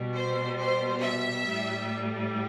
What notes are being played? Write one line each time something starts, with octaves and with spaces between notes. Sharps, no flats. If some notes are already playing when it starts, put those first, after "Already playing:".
Already playing: B2 G3
C5
C5
E5
A2 G3